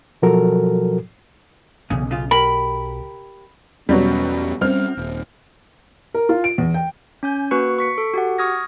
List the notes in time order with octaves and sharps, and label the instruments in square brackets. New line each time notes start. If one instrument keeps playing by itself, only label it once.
[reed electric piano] B2 F3 F#3 F#4 A4 A#4
[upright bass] B1 [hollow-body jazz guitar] E2 C#3
[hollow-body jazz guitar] C#3 F4
[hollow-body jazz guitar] G4 A#4 [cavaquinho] B5
[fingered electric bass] E2 C#4 [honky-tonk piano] B2 F#3 G3
[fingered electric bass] G3 C#4 [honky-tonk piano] C4 F6
[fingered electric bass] D#1
[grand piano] A#4
F4
D7
E2
G5
[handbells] C#4 G#5 G6
A#3 F#4 B4 C#6 F#6 C#7
C#6 B6 C#7
A4
F#4 G4 F#5
C#6 D#6 F6 G#6 A#6